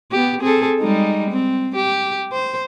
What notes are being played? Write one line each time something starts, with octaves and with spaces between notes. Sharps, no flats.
B3 G4
C4 G#4 A4
G3 G#3 D#4
C4
G4
C5